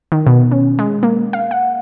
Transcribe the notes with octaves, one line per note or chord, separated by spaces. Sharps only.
D#3
B2
C#4
G#3
A#3
F5
F#5